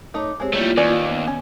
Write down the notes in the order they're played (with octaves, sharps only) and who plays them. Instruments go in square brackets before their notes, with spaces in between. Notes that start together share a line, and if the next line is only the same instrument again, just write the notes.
[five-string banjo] A3 D#4 [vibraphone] C#5 D6
[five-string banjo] G#3 C4 [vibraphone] G4 G#4 C#5
[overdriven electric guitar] G3 A3 [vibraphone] A#3 E4 F4 [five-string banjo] C#5
[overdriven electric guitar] D#2 [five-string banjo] C#4 B4 D5
[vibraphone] B3
[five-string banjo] C#4